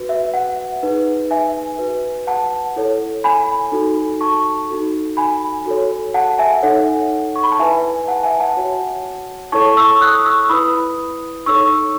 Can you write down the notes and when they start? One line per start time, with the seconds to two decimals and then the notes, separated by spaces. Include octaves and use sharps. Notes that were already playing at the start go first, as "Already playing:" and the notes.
Already playing: F#4 B4
0.09 E5
0.34 F#5
0.83 D#4 G#4 B4
1.31 E5 G#5
1.78 F#4 B4
2.27 F#5 A5
2.76 E4 A4 C#5
3.24 G#5 B5
3.72 D#4 F#4 A4
4.21 A5 C#6
4.69 D#4 F#4 A4
5.17 G#5 B5
5.66 F#4 A4 C#5
6.14 F#5 A5
6.38 E5 G#5
6.63 D#4 A4 C#5 F#5
7.36 C#6
7.43 B5
7.52 A5
7.59 E4 B4 E5 G#5
8.08 F#5 A5
8.23 E5 G#5
8.40 F#5 A5
8.57 F#4 C#5
9.52 E4 A4 C#5 A5 C#6
9.77 C#6 E6
10.01 D#6 F#6
10.25 C#6 E6
10.49 E4 B4 B5 D#6
11.46 D#4 A4 C#5 C#6 E6